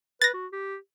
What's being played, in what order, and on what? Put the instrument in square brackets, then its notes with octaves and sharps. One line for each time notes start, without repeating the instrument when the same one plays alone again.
[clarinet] B4 [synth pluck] A6 A#6
[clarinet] F#4
G4